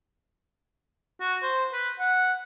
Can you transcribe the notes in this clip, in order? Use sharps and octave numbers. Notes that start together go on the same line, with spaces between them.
F#4
C5
B4
F#5